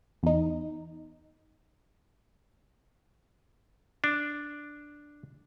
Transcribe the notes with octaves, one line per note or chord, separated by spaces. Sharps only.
E2 D#4
D4